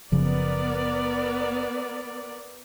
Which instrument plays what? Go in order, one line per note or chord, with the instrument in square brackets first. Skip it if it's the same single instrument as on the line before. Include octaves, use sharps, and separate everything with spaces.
[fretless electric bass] F#1 C#3 F3 [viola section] B3 A#4 D5